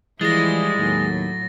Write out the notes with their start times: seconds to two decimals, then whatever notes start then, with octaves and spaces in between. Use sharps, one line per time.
0.21 E3 F3 G3 G#3 E4 A6 A#6
0.79 D#2 A2 F#3